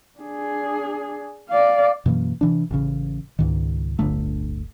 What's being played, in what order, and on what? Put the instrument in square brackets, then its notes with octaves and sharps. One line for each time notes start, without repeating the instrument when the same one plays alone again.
[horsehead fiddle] D4 G#4
D5 F5
[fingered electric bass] F#2 B2 E3 A#3
C3 E3 D4
A1 C#3
C#2 G#2 D#3
D1 G1 D3 A3